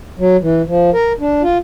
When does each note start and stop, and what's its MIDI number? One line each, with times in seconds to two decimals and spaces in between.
0.19 0.37 54
0.42 0.62 52
0.67 0.90 53
0.93 1.13 70
1.20 1.42 62
1.42 1.58 65